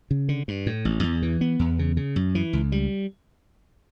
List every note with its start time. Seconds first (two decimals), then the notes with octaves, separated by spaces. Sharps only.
0.11 C#3
0.29 D3
0.48 G2
0.66 A2
0.85 A1
1.03 E2
1.22 E3
1.41 B3
1.59 E2
1.79 C#3
1.97 C#3
2.16 F#2
2.35 E3
2.53 C#2
2.72 G3